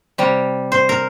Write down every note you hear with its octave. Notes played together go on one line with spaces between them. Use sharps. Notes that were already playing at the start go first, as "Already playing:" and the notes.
C3 G3
C5
A#4